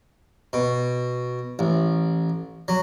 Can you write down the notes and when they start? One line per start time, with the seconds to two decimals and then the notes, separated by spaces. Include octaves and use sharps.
0.53 B2
1.59 A1
2.68 F#3